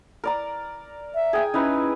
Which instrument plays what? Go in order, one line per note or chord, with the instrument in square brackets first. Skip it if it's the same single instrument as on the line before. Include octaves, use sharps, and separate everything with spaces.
[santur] A#4 D5 A#5
[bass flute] E5
[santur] G#4 G5 G#5
[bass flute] C#4 [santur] D#4 E4 B4